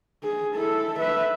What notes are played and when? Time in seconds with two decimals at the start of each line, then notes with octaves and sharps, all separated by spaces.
0.23 G#4
0.56 E4 A4
0.99 B4 E5